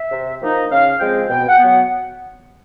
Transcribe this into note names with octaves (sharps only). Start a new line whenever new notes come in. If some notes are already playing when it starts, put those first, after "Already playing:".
Already playing: E5
C3
F3 A#3 D#4
C#3 F5
F3 G#3 C4 G5
B2 G5
F#5
F#3 B3
F#5